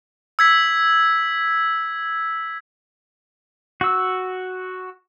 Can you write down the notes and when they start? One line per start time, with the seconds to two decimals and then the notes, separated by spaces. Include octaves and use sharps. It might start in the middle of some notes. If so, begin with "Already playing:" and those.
0.39 E6 G#6 B6
3.81 F#4 E6